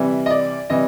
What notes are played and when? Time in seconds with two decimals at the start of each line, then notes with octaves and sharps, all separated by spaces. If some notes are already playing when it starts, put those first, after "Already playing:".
Already playing: C3 E3 G3
0.26 D#5
0.30 D5
0.70 C3 E3 G3 D#5